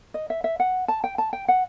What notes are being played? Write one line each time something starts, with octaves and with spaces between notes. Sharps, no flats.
D#5
E5
E5
F#5
A5
G5
A5
G5
F#5